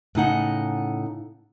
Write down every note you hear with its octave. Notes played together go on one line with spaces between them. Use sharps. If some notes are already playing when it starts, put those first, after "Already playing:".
A2 C#3 D#4 F#5